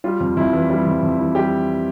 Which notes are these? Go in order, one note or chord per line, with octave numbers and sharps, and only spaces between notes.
G3 F4
F2
F2 E4
E3
G3
F2
F2
E3
G3 G4